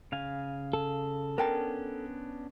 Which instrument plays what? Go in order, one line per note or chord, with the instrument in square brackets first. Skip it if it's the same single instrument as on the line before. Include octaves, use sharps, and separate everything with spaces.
[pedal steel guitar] C#3 F5 G#5
[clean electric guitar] A4
[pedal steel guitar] B3 C#4 D4 [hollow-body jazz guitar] A#4 G5 A5